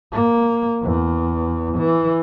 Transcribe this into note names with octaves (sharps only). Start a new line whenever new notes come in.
A#3
E2
E3